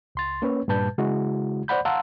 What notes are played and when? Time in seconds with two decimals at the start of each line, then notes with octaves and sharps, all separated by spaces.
0.15 C#2 C6 A6
0.42 A#3 C#4 B4 C#5
0.68 G2 A#2 G3 B4 A5 G6
0.98 C#3 G#3 E4 F#4
1.68 C5 D5 F#5 B5 G6
1.85 F5 F#5 A5 A#5 C6 E6